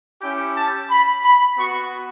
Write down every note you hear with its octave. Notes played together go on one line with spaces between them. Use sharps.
C#4 E4 G4 G5
A5
B5
B5
B3 F#4 C#6